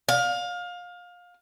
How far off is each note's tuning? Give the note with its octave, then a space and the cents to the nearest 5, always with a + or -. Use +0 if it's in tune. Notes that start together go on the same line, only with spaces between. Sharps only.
F5 +25